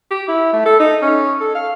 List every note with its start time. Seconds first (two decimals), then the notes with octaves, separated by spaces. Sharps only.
0.11 G4
0.28 E4
0.53 A3
0.66 A4
0.80 D#4
1.02 C#4
1.40 A4
1.55 F5